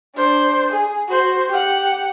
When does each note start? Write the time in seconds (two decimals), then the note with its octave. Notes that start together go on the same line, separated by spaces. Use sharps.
0.15 D4 C5
0.72 G#4
1.09 F#4 C5
1.50 G4 F#5